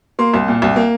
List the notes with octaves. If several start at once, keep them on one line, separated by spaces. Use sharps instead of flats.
A#3 C6
C2
A#2
C2
A#3